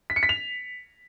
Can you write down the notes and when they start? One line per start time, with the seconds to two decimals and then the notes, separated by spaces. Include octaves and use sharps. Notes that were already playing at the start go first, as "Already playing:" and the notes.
0.10 B6
0.16 C#7
0.23 B6
0.29 F7